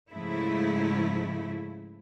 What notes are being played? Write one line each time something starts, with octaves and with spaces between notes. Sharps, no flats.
G#2 C#3 F3 G#3 A3 E4